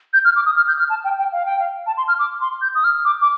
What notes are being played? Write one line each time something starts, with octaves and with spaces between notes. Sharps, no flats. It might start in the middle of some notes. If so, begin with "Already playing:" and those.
G6
F6
D6
D#6
F6
G6
F6
A5
G5
G5
F5
G5
F5
A5
C6
F6
D6
C6
G6
D#6
F6
D6
D6